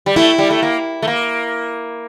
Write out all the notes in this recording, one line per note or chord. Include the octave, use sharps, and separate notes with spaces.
G3
A3 E4
G3
A3
A#3
A3
A#3